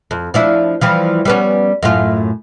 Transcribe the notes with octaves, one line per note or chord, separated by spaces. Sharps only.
F2
F3 D4 E4
E3 F3 G3
G3 B3 C#4
F#2 A2 F4